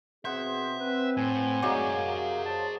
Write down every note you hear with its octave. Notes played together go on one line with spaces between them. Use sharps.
B2 C4 G#4 C5 E5 F#5
C4 B4
A2 G#5
D#3 F#3 G#3 D#4 G#4 D5 F5 F#5
C3 A#4 F5
C5 C#5 A5